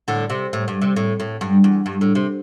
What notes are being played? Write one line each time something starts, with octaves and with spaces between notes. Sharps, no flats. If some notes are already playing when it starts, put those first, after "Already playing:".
A2 D3
C3
A2
G2
C3
A2
A2
G2
E2
G2
A2
C3